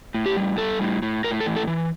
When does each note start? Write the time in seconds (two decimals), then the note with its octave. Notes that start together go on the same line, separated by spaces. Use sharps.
0.14 A2
0.26 G4
0.37 G3
0.58 G3 A4
0.81 A2
1.02 A2
1.24 A2 A#4
1.40 A4
1.46 E3
1.56 A4
1.67 E3